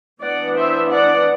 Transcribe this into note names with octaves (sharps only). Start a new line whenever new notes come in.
E3 B3 D4 D5 F#5
C5 E5
D5 F#5